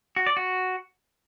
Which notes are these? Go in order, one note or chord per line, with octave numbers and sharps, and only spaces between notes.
F#4
D5
F#4